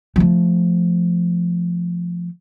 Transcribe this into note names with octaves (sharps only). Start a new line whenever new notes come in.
F3 A3